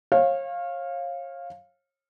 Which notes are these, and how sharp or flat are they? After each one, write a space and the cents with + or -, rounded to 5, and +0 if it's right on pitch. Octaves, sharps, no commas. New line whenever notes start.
C#5 -35 F5 +0